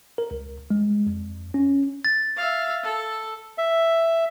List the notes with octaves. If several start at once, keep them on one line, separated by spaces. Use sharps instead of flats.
A#4
C#2
G#3
F2
C#4
A6
E5 F5
A4
E5